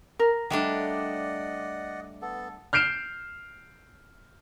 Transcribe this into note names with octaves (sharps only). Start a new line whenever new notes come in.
A#4
G3 A3 D4 D5 D#5 F#5
B3 A4
F6 G6 C7 D7 E7